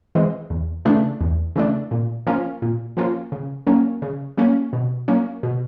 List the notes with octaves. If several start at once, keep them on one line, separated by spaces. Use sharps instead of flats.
E3 G#3 C4
E2
C#3 E3 A3 D4
E2
C#3 E3 A3 D4
A#2
F3 A#3 C#4 F4
A#2
F3 A#3 C#4 F4
C#3
F#3 A#3 C#4
C#3
F#3 A#3 C#4
B2
F#3 A#3 C#4
B2